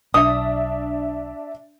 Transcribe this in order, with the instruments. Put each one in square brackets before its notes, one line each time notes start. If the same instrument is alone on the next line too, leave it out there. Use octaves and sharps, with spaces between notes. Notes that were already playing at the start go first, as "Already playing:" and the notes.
[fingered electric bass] B1 [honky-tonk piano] D4 E5 [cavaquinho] D#6